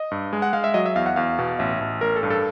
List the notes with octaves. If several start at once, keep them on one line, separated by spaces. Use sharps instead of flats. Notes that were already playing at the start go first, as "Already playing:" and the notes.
Already playing: D#5
G2
G#3
F#5
G#3 F5
E5
F#3 D#5
E5
E2 F5
F#5
E2 F5
B2
A1 E5
A1
A1 A#4
A4
G2
A4